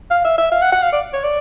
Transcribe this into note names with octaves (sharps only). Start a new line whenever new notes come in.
F5
E5
E5
F5
F#5
F#5
F5
D5
C#5
D5